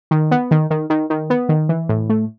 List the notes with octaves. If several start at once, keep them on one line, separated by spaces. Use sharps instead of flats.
D#3
B3
D#3
D#3
D#3
D#3
B3
D#3
E3
A2
A3